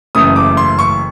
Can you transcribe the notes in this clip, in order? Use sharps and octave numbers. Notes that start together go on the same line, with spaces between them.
F#1 F#2 C#3 E3 A3 D#6
D6
C6
C#6